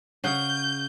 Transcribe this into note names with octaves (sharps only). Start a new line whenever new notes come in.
C#3 F#5 G6